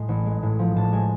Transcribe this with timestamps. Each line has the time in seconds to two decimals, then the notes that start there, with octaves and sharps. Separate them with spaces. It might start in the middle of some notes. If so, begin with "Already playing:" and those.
Already playing: A2 G#3
0.09 A1
0.26 G#3
0.43 A2
0.59 F3
0.76 A2 A5
0.92 G#3 G#5